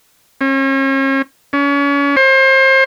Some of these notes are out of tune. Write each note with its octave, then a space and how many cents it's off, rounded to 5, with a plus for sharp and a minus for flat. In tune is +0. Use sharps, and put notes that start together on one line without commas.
C#4 -40
C#4 +35
C5 +30